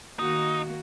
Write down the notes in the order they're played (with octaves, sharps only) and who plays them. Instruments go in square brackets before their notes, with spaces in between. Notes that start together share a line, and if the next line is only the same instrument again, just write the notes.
[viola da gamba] D#3 A#3 F#4 [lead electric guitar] D#4